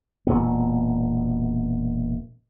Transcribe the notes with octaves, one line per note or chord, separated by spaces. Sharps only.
E1 A#2 B3